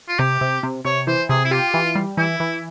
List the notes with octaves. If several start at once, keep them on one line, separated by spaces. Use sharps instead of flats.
F4
C3 G4
C3
C3
C3 C#5
E3 C5
C3 G#4
E4
F4 G4
E3
G3
E3 E4
E3